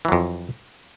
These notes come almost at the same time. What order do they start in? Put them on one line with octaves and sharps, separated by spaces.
E3 F#3 F2